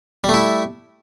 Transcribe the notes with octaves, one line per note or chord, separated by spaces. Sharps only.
G3 A3 E4